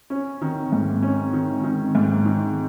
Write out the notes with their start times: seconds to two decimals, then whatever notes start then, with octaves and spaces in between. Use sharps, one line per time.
0.10 C#4
0.42 D#3
0.72 G#2
1.03 C#4
1.33 D#3
1.64 D#3
1.95 G#2
2.26 D#3